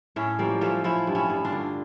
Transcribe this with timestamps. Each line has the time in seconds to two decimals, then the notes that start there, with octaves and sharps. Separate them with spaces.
0.16 A2 A3 C#4
0.39 F3 G3 A#3
0.61 F3 A3 C#4
0.84 F3 C#4 E4
1.07 G2
1.15 C#4 E4
1.30 G2
1.45 D4 F4
1.52 D3